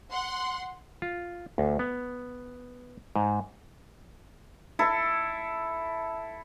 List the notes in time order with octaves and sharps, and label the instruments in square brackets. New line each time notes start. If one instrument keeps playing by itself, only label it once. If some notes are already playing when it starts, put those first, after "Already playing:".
[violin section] F#5 C6
[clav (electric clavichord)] F4
D2
B3
G#2
[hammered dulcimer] E4 A4